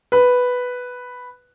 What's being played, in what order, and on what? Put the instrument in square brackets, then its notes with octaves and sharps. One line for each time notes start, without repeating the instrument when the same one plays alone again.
[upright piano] B4